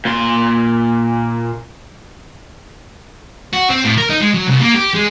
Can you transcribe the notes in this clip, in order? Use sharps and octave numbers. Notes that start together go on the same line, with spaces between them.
A#2 C6
F#4
C4
A2
A#4
D#4
G#3
F#3
C2
A#3
G4
G#3